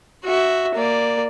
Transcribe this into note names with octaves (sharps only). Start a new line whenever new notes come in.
F#4 E5
A#3 D5